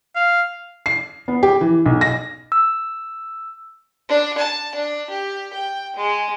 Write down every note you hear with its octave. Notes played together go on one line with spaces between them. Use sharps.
F5
C7
B3
G4
E3
B1
A#6
E6
D4
A5
D4
G4
G5
G#3